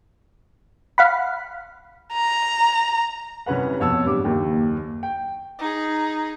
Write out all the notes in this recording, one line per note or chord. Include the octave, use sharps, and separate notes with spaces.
F5 F#5 B5
A#5
C2 C3 C#4 B4 F#5
F2 B2 C#5 F#5 A5 E6
D1 G2 D6
F#1 D#2 G5
G5
D#4 G#4